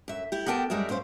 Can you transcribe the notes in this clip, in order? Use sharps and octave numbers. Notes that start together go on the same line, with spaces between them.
F#2 E5
E4 G4
B3 G4 A#4 G5 A5
F#2 G3 G#3 A#4 E5
F#2 C4 C#4 C5 F5